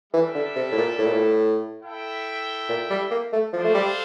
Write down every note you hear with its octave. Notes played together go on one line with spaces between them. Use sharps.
E3 G3 D4 A4 E5
D3
C3
A2
A#2
A2
A#2
A2
E4 A4 E5 G5
A#2
G3
A#3
A3
F3 D4 A4 C5 F5
A3
G3